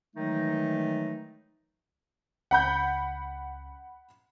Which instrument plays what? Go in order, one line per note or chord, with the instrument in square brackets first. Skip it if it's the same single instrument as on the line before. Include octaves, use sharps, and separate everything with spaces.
[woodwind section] D#3 E3 F#3 G#3 A3 D#4
[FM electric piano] C#2 [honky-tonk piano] F#5 B5 G6